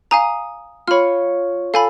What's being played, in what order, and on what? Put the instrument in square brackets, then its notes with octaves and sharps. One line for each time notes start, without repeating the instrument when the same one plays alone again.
[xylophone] F5 G#5 A#5 [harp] D#6
[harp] F4 C#5 [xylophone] B5 F6
[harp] A4 [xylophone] F5 G#5 B5